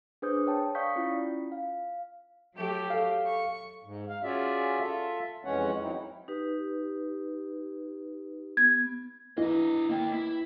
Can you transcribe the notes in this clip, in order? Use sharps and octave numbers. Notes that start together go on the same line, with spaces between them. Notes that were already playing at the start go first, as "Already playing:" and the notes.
D4 G#4 B4 C5 D#6 G6
C#5 G5 A5
D5 F5 C#6 D#6 G6 B6
C#4 E4 F4
F5
F#3 A3 G4
A4 F5
C#6
G#2
F5
C#4 F4 F#4 G#4 D5 E5
F4 A4 E5
F2 E3 G#3 C#4 C#5 F#5
F#3 C4 D#4 E4
D#4 G4 B4
B3 G#6
E3 E4 D#5
A#3 G5
E4